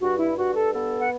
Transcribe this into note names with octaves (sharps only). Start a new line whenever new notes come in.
G2 F#4
E4
G2 F#4
A4
B3 A4
F#5